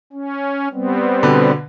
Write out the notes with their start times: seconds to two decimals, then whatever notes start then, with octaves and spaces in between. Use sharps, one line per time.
0.13 C#4
0.73 G3 B3 C4
1.23 B2 D3 B4